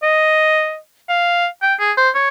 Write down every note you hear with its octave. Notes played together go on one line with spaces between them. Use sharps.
D#5
F5
G5
G#4
C5
C#5